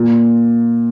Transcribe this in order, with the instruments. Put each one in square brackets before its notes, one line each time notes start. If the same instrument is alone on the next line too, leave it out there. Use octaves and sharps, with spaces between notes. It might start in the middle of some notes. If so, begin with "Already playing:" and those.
Already playing: [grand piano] A#2